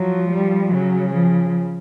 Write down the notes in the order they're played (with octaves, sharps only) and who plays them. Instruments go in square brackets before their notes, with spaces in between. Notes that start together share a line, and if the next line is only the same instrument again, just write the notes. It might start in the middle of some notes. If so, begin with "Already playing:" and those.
Already playing: [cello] F3 [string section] F#3
[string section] G3
[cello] C#3 [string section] F#3
[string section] F3